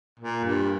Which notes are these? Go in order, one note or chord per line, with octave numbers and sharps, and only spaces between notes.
A#2
G2